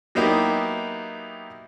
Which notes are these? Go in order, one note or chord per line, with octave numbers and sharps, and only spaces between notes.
F#3 A#3 B3 D#4 E4 G4